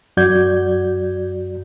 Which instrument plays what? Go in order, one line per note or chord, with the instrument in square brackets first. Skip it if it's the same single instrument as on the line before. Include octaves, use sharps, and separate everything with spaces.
[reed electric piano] F#2 F#3 F#4 D5 G6 G#6